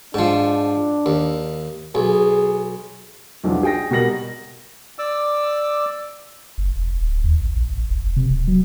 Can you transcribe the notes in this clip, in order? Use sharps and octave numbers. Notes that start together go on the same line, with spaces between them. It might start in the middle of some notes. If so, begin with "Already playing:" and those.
G#2 F3 D4
D#2
B1 G#4
B1 E2 F3 D4
G#4 G5 A#6
B2 G3 A#4 A#6 F#7
D5 D6 E6
F#1
E1
D1
D#2
A1
A#1
A1
E1
C3
D1
F#3